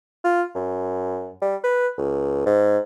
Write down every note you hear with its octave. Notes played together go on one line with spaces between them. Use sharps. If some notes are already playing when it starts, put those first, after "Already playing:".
F4
F#2
G3
B4
C#2
G#2